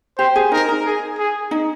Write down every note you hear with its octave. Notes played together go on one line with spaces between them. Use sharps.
G4 C5
G#4
D#4 A#4
D#4
G#4
G#4
D#4